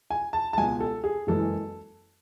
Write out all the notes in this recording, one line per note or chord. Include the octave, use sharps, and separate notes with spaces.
G#5
A5
A5
C#2 B2 G#3 G#5
A4
G#4
F#1 F#2 E3 G#3 A4